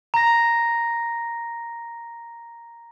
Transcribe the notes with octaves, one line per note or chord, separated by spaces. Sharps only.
A#5 A#6